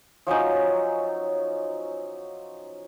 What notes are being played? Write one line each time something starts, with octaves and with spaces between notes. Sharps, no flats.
F3 F#3 C#4 D#4